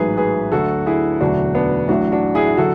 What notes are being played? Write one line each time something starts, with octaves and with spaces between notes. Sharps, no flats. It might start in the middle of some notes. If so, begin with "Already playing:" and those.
Already playing: A1 G#2 F#3 G#4 B4
G#4 B4
D2 D3 F#3 F#4 A4
E4 G#4
E1 D2 D3 F#3 D4 F#4
B3 D4
A1 A2 F#3 D4 F#4
D4 F#4
E4 G#4
D3 F#3 F#4 A4